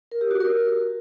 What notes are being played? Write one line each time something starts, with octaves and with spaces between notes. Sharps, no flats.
A#4
G4
F#4
A#4